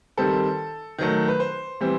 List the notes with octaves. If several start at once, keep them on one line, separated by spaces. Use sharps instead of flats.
D#3 G3 C4 A4
D#3 F#3 A3
B4
C5
E3 G3 C4